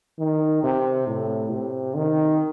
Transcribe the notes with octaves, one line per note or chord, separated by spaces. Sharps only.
D#3
C3
A2
C3
D#3